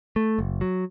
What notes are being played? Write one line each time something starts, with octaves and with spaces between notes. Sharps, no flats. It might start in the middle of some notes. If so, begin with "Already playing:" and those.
A3
F#1
F#3